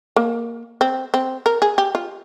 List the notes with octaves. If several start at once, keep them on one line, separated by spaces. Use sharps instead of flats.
A#3
C4
C4
A#4
G#4
G4
F4